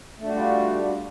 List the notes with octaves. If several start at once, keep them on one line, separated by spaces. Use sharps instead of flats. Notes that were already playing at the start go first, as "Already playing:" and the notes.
G3 A3 D4 F4 F#4